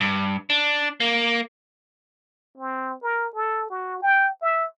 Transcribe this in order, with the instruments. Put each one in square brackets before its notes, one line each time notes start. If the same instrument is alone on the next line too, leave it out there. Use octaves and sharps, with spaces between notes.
[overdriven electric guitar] G2
D4
A#3
[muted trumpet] C4
A#4
A4
F#4
G5
E5